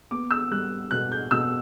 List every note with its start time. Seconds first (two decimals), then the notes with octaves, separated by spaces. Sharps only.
0.11 B3 D6
0.31 E6
0.51 G3 F#6
0.91 B2 F#6
1.12 G6
1.31 B2 E6